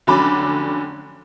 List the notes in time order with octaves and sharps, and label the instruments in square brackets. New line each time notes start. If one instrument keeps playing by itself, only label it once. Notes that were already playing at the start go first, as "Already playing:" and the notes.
[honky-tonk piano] F1 D3 F#3 C#4 B5 D6